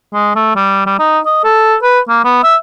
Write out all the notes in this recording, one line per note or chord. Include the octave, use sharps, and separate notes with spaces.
G#3
A3
G3
G3
D#4
D#5
A4
B4
A#3
B3
E5